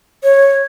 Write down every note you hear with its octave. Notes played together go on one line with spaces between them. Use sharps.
C#5